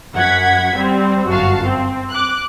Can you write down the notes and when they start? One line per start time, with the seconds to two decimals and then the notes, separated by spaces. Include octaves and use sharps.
0.15 F#2 F#5 G#6 B6
0.77 G3 C4
1.29 G1 F#2 F#4 F5 A5
1.65 C4
2.10 D6 F#6